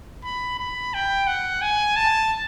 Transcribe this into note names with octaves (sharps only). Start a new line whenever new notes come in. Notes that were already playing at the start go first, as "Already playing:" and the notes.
B5
B5
G5
F#5
G#5
A5